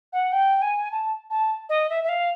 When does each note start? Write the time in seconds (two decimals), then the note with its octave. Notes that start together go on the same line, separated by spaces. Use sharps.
0.13 F#5
0.32 G5
0.62 G#5
0.91 A5
1.30 A5
1.69 D#5
1.89 E5
2.03 E5
2.09 F5